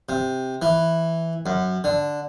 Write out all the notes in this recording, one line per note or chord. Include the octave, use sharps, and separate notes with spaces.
C3
E3
F#2
D3